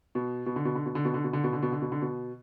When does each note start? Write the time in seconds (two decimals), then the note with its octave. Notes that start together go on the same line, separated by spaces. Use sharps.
0.15 B2
0.46 B2
0.56 D3
0.65 B2
0.75 D3
0.86 B2
0.95 D3
1.05 B2
1.14 D3
1.24 B2
1.33 D3
1.44 B2
1.53 D3
1.62 B2
1.72 D3
1.82 B2
1.92 D3
2.02 B2